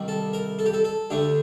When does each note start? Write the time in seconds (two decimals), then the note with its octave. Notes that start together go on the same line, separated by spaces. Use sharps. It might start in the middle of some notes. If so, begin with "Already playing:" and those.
Already playing: C2 C3 D#3 G3
0.08 A4
0.33 A#4
0.59 A4
0.66 G4
0.74 A4
0.84 A4
1.10 D2 D3 A3 G4